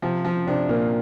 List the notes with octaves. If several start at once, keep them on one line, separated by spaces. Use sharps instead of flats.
C3 F3
F3
C3 D4
A#2 A#3